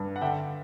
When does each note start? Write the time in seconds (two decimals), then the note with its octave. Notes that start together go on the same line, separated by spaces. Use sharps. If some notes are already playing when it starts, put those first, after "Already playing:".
Already playing: G2
0.16 F#5
0.21 D3 E5 G5